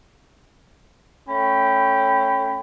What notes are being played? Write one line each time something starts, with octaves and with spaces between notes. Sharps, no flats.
A3 C#4 G5 B5